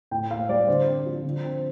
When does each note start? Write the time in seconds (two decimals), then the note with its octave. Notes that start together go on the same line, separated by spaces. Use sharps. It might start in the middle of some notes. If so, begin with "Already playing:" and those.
0.11 A2 G5
0.30 A#3 F5
0.49 G3 D5
0.67 D3 C5
0.87 C4
1.06 F3
1.24 D3
1.43 C4